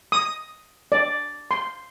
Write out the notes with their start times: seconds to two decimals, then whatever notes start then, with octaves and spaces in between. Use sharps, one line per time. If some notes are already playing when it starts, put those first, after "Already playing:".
0.12 D#6
0.92 D5
1.51 C6